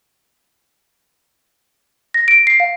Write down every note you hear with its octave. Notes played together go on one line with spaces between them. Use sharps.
A#6
D7
C7
F5